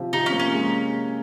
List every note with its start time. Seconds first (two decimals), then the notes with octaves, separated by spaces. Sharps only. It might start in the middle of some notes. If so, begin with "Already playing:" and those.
Already playing: C3 F3
0.13 C3 D#4
0.26 C#4
0.33 A#3
0.39 C#4
0.53 G#3